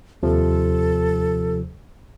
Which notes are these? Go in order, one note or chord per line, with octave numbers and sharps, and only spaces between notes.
D#2 C3 F3 A4